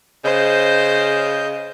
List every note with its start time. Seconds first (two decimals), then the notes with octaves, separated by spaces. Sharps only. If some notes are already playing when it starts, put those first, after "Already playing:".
0.25 C#3 C5 D#5 G6